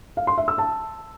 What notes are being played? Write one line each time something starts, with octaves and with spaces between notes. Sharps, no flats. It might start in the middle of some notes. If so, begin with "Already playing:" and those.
F5
C6
E5
E6
A5